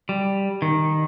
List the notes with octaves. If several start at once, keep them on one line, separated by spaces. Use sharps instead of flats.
G3
D#3